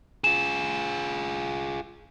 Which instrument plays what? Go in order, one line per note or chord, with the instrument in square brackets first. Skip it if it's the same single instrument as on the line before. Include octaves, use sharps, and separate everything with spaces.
[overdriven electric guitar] F4 G#4 [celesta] E7